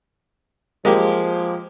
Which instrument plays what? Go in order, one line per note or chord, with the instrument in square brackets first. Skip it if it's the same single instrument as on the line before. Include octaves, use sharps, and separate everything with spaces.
[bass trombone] F3 [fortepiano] G#3 A#3 G4